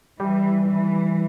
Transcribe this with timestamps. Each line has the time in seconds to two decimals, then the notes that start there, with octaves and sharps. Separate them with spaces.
0.19 E3 G3
0.67 E3